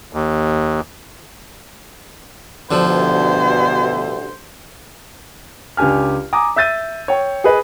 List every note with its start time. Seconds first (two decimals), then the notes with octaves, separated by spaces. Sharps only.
0.13 D#2
2.71 A1 D2 G2 B2 D3 F3 C5
5.77 C#2 D4 G4 G#5 F6
6.33 G#5 A#5 D6 D#6
6.56 E5 E6 G6 A6 D#7
7.08 C#5 G5
7.44 G#4 B4 D#5